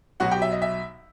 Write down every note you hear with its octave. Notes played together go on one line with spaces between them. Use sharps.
B1 B2 F#3 F#4 F#5
G4 G5
E5
D#5
E5